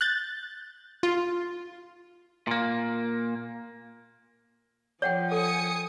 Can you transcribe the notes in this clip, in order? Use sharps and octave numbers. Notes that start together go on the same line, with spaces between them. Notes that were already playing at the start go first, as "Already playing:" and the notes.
F#6 G6 A6
F4
A#2 A#3
F3 C#5 F#5 G5
A4 G#5 D#6 C#7